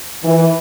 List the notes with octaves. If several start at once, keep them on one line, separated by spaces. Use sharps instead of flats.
E3